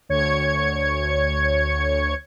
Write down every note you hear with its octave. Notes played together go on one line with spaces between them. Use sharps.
D2 C#5 G#6 C#7